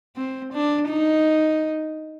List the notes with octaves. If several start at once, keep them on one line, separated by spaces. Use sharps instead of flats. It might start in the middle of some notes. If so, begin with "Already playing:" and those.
C4
D4
D#4